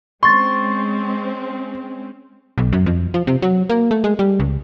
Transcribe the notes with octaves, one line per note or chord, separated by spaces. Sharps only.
G#3 C4 C#4 C6 C#6 A6
B1
F#2
F2
F3
C3
F#3
A#3
A3
G#3
G3
C#2